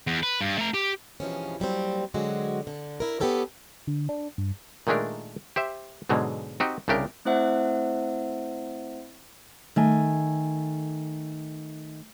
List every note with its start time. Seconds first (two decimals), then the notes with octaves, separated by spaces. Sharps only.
0.07 E2
0.23 B4
0.41 G2
0.58 A3 A#5
0.74 G4
1.20 G2 B2 E3 F3 G#3 C#4
1.60 F#3 G3 A#3 C4
2.14 D3 F#3 G#3 C4 F#4
2.67 D3
3.00 E4 A#4
3.20 B3 C4 G4 A4 A#4 C#5
3.87 D3
4.09 D4
4.38 G2
4.87 A#2 D#3 G#3 A3 D4 A#4
5.56 G4 C5 E5
6.09 G#2 B2 D3 F#3 G#3
6.60 C4 D#4 F#4 G4
6.88 C2 C#3 D4 G4 A#4
7.25 A3 C4 E4 C5 E5 F#5
9.76 D#3 A3 G#5